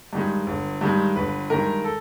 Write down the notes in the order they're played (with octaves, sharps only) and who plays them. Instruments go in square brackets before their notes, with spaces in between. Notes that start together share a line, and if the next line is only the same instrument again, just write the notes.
[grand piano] G2 D#3 G#3
G1
G2 D#3 G#3
G1 B4
G2 D#3 G#3 A#4
A4